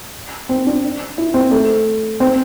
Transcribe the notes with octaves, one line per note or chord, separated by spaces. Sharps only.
C4
D4
E4
C4
A3
C4